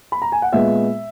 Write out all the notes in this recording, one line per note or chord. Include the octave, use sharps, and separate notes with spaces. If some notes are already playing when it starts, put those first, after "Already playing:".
B5
A#5
G#5
F#5
A#2 G#3 B3 E5